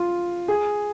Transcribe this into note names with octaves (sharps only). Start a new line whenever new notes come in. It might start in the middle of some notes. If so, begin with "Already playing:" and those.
Already playing: F4
G#4